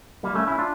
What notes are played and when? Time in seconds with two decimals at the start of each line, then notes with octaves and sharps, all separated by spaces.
0.24 G3 A#3
0.35 A3 C#4
0.47 C#4 E4
0.58 D4 F4